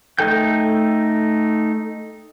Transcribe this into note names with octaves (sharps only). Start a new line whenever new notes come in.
A3 D#4 A4 G5 G6